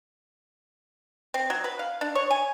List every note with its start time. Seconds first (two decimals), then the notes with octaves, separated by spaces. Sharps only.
1.34 C4
1.50 F#3
1.64 B4
1.79 F5
2.01 D4
2.15 C#5
2.30 G#5